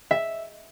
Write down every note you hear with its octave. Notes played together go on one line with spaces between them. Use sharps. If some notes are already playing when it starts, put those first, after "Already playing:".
E5